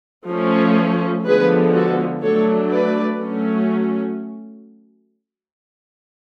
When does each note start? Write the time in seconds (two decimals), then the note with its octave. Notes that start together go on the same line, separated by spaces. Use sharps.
0.28 F3 A3 C#4
1.25 D3 F3 G#3 B3 G#4 B4
1.74 F#4 A4
2.22 F#3 A3 D4 A4 C#5
2.71 B4 D5
3.20 F#3 A3 C#4